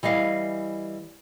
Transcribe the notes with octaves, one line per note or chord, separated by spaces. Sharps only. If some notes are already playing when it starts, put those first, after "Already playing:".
E3 G3 D#5 F5